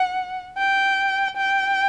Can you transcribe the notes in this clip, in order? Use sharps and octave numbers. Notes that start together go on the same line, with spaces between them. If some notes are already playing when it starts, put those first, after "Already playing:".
Already playing: F#5
G5
G5